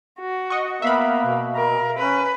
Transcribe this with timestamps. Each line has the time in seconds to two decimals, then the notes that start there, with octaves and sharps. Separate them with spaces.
0.20 F#4
0.50 D#5 F#5 C#6
0.82 A#3 B3 E5 F5 B5
1.25 B2
1.56 A#4
1.98 C#4 B4